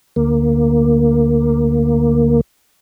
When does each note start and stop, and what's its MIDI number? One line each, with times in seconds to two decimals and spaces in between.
0.16 2.41 38
0.16 2.41 58